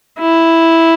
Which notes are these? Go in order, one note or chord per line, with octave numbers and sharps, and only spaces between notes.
E4